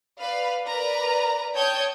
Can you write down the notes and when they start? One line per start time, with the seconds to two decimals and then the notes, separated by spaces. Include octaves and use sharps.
0.19 B4 D5 F5
0.66 A#4 B4 D5 A#5
1.55 C#5 G5 A5 D#6 G6 G#6